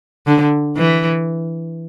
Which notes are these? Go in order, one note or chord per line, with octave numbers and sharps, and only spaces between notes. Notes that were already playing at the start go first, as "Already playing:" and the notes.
D3
E3